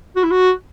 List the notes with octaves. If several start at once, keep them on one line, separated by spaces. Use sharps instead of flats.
F#4
E4
F#4